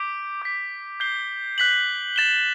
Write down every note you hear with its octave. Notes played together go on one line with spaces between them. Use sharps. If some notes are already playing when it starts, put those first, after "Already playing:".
Already playing: D6 G6 B6 D7 G7
D6 G6 B6
G6 C7 G7
F#6 B6 F#7
A6 E7 G7